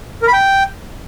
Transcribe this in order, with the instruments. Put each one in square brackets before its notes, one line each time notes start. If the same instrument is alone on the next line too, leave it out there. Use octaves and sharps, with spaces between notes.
[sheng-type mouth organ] A#4
B5
G5